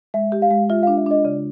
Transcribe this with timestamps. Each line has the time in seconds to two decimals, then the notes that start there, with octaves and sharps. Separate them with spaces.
0.14 G#3 E5
0.32 G4
0.42 F5
0.51 G#3
0.70 F4 E5
0.83 D4 F5
0.97 E5
1.06 D4 D#5
1.25 C#3 D5